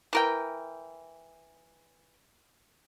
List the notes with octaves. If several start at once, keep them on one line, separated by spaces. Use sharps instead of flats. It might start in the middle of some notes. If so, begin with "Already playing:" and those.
E3 A#4 G5